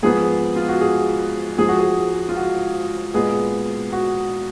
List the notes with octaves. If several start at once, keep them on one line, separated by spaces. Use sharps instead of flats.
G#2 F3 B3 G#4
F4
F#4
G#4
G#2 F3 G#3 G#4
F#4
G#4
F4
F#4
A#2 G#3 B3 G#4
F#4